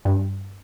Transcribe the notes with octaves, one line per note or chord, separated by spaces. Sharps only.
G2